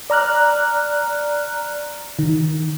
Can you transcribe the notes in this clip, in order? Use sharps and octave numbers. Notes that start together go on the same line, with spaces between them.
D5 A#5 F6 F#6
D#3